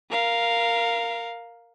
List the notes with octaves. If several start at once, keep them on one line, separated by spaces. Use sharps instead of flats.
A#4 F5